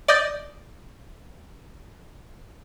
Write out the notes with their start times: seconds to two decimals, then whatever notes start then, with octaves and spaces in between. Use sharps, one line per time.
0.08 D5 D#5 G6